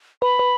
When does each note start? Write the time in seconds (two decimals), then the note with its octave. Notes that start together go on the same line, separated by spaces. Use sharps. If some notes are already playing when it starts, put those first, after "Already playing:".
0.22 B4 B5
0.39 B4